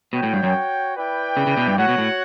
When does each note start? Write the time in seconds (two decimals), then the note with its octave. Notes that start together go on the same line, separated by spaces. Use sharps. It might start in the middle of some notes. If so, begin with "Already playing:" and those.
0.13 B2 F#4 C#5 G5
0.23 A2
0.33 G2
0.43 F#2
0.96 E4 B4 D5 G5
1.37 C#3
1.47 C#3
1.57 B2
1.67 G2
1.77 A2 F#4 C#5 F#5
1.88 B2
1.98 A2